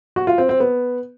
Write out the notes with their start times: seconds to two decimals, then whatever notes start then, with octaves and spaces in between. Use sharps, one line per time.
0.16 F#4
0.27 F4
0.38 C4
0.49 C4
0.60 B3